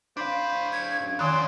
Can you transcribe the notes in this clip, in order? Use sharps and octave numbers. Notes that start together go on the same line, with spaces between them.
D4 C5 F5 B5
G#6
F#2
F2 D#3 C#4 D5 C6 F#6